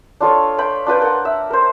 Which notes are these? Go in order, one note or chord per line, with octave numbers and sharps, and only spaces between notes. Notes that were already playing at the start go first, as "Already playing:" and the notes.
D4 F4 A4 C#5
F5 G5 B5
D4 F4 B4 G5
A#4 F#5
E5
A#4 C5